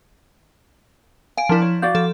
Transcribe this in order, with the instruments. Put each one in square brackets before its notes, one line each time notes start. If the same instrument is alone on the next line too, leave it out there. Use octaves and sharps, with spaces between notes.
[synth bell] F5 D7 [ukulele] G#5
[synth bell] F3 E4 [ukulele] D4 A#4 A5
[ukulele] C#5
[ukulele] F#4 D5 F5 [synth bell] G6 A6
[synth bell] F3 A4